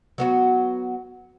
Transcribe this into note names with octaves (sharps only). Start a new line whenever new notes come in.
F#3 B3 F#4